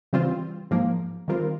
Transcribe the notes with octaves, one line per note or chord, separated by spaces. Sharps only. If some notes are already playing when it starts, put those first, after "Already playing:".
C#3 E3 G3 C4 F4
G#2 F3 A#3
D#3 G3 C4 F4 A#4